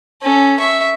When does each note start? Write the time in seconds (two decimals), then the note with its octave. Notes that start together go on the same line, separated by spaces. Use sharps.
0.22 C#4 A4
0.59 E5 C#6